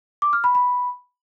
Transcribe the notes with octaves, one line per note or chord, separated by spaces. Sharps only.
D6
F6
B5
B5